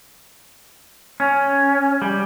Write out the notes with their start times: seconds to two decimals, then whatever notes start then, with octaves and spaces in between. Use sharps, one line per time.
1.20 C#4
2.02 G3